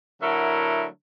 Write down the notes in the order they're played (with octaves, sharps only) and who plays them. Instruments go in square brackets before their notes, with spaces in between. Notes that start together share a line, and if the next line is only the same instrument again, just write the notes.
[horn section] D3 F#3 A3 E4 A#4